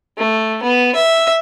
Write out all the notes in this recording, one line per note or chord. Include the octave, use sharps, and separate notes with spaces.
A3
B3
E5